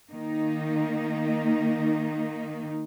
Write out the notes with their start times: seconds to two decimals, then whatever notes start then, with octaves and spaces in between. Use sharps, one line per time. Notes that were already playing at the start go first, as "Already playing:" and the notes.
0.11 D#3 A#3 D#4